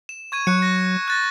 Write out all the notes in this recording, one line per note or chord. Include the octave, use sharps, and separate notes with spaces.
E7
C#6 G#6 D#7
F#3 C#6 F#6 C#7
A#6
F#6 A6 A#6